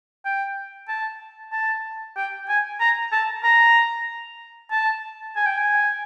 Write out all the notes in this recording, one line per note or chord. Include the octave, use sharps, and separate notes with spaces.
G5
A5
A5
G5
G#5
A#5
A5
A#5
A5
G#5
G5
G#5